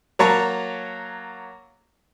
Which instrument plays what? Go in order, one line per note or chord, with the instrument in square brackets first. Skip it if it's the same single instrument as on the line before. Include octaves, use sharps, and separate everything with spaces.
[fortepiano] F#3 A#3 C#5 A5 A#5 C#6